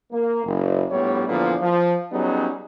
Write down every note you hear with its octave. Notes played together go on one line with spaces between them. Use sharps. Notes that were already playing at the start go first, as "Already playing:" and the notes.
A#3
F#1
A#1 A2 G3 B3 C#5
E2 A#2 D3 F3 A#3 B3
F3
F#3 G3 B3 C#4 D#4 G#4